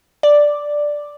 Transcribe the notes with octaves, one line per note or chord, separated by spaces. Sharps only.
D5